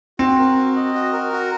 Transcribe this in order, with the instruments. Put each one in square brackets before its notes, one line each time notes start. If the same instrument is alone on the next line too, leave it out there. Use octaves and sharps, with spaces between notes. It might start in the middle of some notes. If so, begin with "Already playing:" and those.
[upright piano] C4 [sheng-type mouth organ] F#4
[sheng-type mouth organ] A#4
F#4
D#5
F#4
A#4
F#4